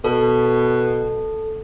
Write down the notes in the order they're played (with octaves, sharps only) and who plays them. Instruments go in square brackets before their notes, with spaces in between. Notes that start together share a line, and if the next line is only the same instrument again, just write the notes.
[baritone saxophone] B2 [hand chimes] A4